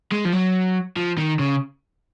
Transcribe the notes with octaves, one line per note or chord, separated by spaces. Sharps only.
G#3
F3
F#3
F3
D#3
C#3